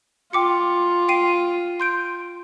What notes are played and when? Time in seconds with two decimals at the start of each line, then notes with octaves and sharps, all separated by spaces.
0.33 F4 G5 D6 C#7
1.08 G5 C7 D#7
1.80 C6 G6 D7